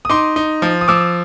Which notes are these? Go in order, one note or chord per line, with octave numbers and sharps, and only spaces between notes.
D#6
D#4 C6 D6
D#4
F3
D#6
F3 D6 E6